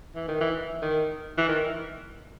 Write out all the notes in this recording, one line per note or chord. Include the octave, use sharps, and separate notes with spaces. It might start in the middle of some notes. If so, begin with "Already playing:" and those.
E3
D#3
E3
D#3
E3
D#3